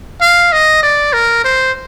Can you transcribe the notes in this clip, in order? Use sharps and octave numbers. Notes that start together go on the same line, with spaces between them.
F5
D#5
D5
A#4
C5